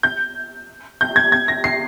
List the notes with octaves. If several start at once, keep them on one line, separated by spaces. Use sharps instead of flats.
G6
G6
G#6
G#6
A#6
C7